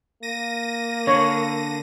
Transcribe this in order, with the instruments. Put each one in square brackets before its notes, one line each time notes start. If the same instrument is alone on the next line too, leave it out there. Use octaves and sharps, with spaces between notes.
[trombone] A#3 [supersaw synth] A#6 D#7
[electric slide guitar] D3 [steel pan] C#5